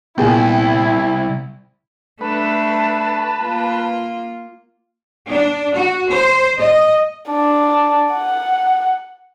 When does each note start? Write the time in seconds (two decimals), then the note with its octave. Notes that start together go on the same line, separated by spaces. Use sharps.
0.18 C2 A#2 B3 E4 G#4 G5
2.21 A3 D4 B4 A5
3.42 A#3 F4
5.29 D4
5.74 F#4
6.12 C5
6.59 D#5
7.31 D4
8.13 F#5